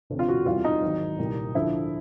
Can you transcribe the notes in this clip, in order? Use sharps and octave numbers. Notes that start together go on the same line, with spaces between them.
E1 D2 C3
F4
F#4
E2 C3 E3 G3 F4
D#4
G#1 G#2 D#3 F#3
C2 A#2 G3
D2 D3 F3 E4